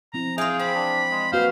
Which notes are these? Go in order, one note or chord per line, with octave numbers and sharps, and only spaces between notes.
F3 C4 E4 A#5
F4 G#4 E5 F5 G5
C4 B5
D4
G#3
A#3 F#4 B4 C5 F5